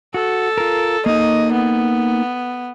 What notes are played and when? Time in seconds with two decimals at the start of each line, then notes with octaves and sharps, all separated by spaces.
0.14 F#4 A4
0.58 F4 A#4
1.06 A#3 D#4 D#5
1.53 B3